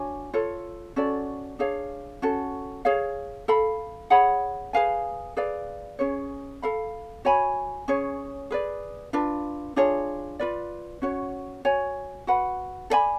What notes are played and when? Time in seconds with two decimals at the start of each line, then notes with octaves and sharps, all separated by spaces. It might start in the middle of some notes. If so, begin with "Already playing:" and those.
Already playing: D4 F#4 C#5 G#5
0.34 F4 A4 C#5
0.96 C#4 F#4 A4 D5
1.59 D4 G#4 C#5 F5
2.22 C#4 F#4 A4
2.85 G#4 C#5 F5
3.48 A4 F5 B5
4.10 G#4 C#5 F#5 B5
4.73 G#4 B4 F5 G#5
5.37 G#4 B4 D5 F5
5.99 C#4 G#4 C#5
6.62 A4 F5 B5
7.25 F#4 C#5 G#5 B5
7.88 C#4 G#4 C#5
8.51 G#4 B4 D5
9.13 D4 F4 B4
9.76 D4 F4 G#4 C#5
10.39 F4 B4 D5
11.02 C#4 F#4 C#5
11.65 F#4 C#5 G#5
12.27 F#4 B4 F#5 B5
12.90 A4 D5 G#5 B5